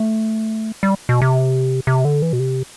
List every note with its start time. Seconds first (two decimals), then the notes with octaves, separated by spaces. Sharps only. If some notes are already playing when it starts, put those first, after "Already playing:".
Already playing: A3
0.83 G3
1.09 B2
1.22 C3
1.87 C3
2.05 D3
2.22 E3
2.33 B2
2.39 C3